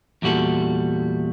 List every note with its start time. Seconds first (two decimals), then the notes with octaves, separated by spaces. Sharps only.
0.22 E2 A#2 G3 F#4 A4